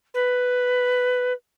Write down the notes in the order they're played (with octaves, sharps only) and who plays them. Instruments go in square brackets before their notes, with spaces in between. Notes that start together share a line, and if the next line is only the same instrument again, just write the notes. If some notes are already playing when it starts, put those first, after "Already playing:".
[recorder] B4